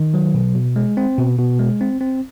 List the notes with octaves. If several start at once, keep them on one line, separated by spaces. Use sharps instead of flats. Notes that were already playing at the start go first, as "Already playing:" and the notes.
Already playing: D#3
F#3
B2
B2
G#3
C4
B2
B2
G#3
C4
C4